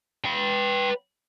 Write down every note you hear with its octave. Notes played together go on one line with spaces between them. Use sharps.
B4 G5